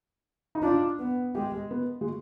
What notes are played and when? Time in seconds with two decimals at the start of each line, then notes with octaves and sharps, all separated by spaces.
0.55 D#4
0.62 D4 F4
0.99 B3
1.35 G#3 G4
1.71 B3
2.01 G#3